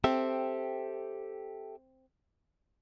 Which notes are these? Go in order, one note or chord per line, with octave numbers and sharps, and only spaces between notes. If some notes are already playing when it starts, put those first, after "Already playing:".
C4 G4 A4 E5